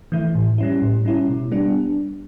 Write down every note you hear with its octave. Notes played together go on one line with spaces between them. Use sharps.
E3 A3 E4
A2
G3 C#4 E4
A2
G3 C#4 E4
B2
G3 B3 D4